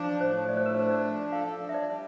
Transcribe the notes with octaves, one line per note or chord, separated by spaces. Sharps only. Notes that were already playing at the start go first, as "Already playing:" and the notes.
Already playing: F3 D4
A2 C5
A3 D5
C5
A#4
D4 C5
D5
F3
A4 F5
D4
E5
D5
G3